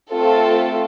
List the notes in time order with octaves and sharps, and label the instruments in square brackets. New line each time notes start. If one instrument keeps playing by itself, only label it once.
[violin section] A3 C4 F4 A4